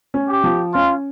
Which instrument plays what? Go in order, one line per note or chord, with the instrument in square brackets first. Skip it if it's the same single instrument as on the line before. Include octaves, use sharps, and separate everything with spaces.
[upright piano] C#4
[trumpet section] G4
[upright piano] F3
[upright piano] C#4 [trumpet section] F4